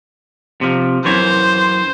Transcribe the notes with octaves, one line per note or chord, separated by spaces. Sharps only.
C3 F3
F#2 E3 C5 C#5